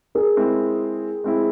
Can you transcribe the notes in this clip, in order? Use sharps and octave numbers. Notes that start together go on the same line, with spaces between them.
G#4 A#4
G#3 C4 E4
G#3 C4 E4